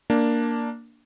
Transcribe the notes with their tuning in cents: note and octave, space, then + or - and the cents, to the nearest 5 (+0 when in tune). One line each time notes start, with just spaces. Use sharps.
A#3 +0 D4 +0